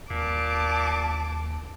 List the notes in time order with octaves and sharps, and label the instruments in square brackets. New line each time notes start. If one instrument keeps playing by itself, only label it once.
[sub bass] D#2 [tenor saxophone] A#2 [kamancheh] A5 D6